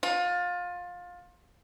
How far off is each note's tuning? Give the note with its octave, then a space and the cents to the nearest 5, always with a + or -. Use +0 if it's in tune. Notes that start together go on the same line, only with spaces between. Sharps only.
F4 +25